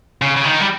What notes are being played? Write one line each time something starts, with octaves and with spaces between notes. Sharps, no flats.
C#3
C#3
D#3
G3